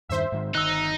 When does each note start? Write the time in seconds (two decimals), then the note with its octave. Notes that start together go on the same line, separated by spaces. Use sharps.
0.09 E2 G2 D#3 C5 E5
0.32 G#2 D#3 G#3
0.55 G1 D#3 D#4 E6 F#6